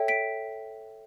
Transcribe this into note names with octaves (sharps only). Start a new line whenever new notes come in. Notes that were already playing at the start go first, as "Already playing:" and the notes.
Already playing: A4 C#5 E5 G5
B6 D7